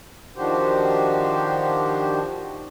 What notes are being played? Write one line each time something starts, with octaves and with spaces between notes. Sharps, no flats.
D#3 F3 D4 F#4 G4 C5